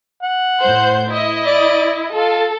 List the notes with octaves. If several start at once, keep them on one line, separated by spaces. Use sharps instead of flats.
F#5
A2 C5 G6
E4 D#5
D5
F4 A4